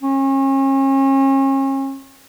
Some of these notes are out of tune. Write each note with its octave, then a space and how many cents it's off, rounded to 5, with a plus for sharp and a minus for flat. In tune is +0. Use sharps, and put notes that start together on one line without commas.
C#4 -35